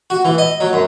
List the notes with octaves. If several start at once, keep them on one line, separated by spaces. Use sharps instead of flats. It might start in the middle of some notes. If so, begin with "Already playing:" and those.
F#4
E3
D#5
F#3
F#2